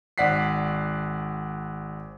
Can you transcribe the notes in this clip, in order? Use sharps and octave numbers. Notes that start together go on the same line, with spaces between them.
G#1 D5 F#5 B6 C7